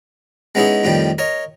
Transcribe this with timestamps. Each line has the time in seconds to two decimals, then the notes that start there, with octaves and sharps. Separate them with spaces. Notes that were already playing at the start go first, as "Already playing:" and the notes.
0.55 G#3 B3 C#4 D#4 E4 G#4
0.84 F2 A2 D#3 F3 G3
1.18 A#4 C#5 D#5